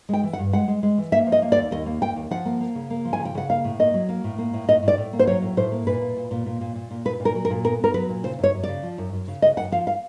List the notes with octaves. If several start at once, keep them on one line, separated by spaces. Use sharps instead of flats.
G#3 G5
E3
F#5
G2
G#3 F#5
G#3
G#3
E3
A#3 E5
F3
D#5
A#3
D5
D#2
D#2 D#5
A#3
D#2 G5
D#2
F3 F#5
A#3
A#3
C#3
A#3
F3
G#5
C#3
G5
C#3 F#5
A#3 F5
A2
A#3 D#5
F#3
A#3
A2
A#3
A2
A2 D#5
A2
D5
A2
A#3
C5
F#3 C#5
A2
A2 C5
A#3
A#2 B4
A#2
A#2
A#2
A#2
A#2
A#2
A#2
A#2 B4
A#2
A#4
F#3
A#4
A#2
B3 A#4
B3 A#4
F#3 B4
A#2
C#3 C5
F#2 C#5
F#2
C#3 D5
F3
F#2
F#2
C#3
C#3 D#5
F#2 F#5
F3 F5
F5